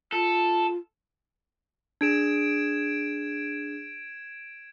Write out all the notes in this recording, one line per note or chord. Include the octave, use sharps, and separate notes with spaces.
F4 A4
D4 G#4 G#6 D7 E7